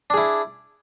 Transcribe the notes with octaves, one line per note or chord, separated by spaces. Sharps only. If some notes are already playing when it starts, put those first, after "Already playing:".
D4 E4 G#4